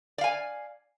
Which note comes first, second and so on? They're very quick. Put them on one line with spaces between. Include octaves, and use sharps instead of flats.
D5 F5 G#5